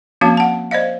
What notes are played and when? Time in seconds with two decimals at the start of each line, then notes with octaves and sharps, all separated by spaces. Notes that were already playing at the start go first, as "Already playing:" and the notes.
0.21 F3 A#3 C4 C#4 F#4 F5
0.37 F#5 A5
0.71 C5 D5 D#5 F5